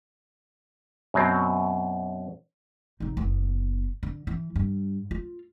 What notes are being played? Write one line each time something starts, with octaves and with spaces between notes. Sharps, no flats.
F#2 B2 F#3 C4
F1 D#4
F#1 B3
D3
E3
G2
F4